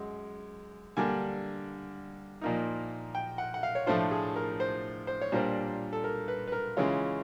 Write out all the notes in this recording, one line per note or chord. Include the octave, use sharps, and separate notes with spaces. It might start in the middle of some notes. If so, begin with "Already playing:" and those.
Already playing: F#2 G#3
D3 G3 A#3 D4 G#5
A#2 F3 A#3 D#4
G5
F#5
F#5
F5
C#5
A2 F3 A3 D4 F4 C5
G#4
A#4
C5
C5
C#5
A#2 G3 A#3 D4 F4 C5
A4
A#4
B4
B4
A#4
C#3 E3 G#3 C#4 F4